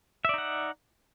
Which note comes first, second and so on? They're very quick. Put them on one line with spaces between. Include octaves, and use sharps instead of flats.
E5 D5 D#4 F#5